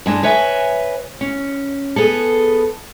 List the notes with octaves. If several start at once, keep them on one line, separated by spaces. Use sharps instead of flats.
G2 G#3 D4
B4 C#5 D#5 E5 G#5
C#4
B3 G#4 A4